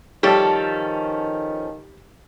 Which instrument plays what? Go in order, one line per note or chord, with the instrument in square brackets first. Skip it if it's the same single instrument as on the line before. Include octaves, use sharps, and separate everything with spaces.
[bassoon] D#3 [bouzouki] F3 C#4 A4 [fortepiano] G3 G4